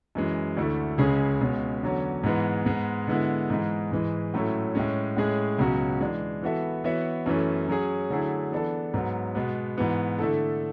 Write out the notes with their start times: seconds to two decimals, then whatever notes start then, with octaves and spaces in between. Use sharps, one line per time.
0.15 F#2 E3 G#3
0.57 D2 D3 A3 E4
0.98 C#2 C#3 G#3 C#4 G#4
1.41 C#2 B2 G#3 C#4
1.83 E2 D3 F#3 C#4
2.24 G#2 E3 G#3 B3
2.66 G#2 G#3 B3
3.07 D3 G#3 B3 E4
3.50 G#2 E3 G#3
3.91 G#2 E3 G#3
4.34 A2 F#3 A3 C#4 E4
4.75 A2 G#3 C#4
5.17 A2 G#3 C#4 G#4
5.59 C#2 B2 F#3 C#4 F#4
6.01 E3 G#3 D4
6.42 E3 B3 F#4 A4 E5
6.84 E3 B3 F#4 C#5 E5
7.26 F#2 E3 A3 C#4
7.68 F#3 C#4 G#4
8.10 D3 F#3 A3 E4 G#4
8.52 E3 B3 D4 A4
8.94 G#2 F#3 B3
9.35 B2 G#3 B3
9.78 G#2 E3 B3
10.19 D3 A3 E4 A4